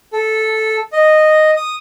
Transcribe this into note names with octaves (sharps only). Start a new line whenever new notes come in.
A4
D#5
D#6